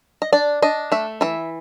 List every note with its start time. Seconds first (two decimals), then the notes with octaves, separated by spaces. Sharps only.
0.22 D#5
0.33 D4 D5
0.62 D4 D#5
0.92 A3 E5
1.21 E3 E5